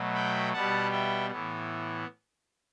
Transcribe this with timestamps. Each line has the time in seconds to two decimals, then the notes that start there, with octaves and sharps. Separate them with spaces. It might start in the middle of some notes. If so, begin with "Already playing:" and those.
Already playing: B2 F#3 A3
0.14 G5 B5
0.53 B2 G3 B3 F#5 A5
0.91 E5 G5
1.30 A2 E3 B3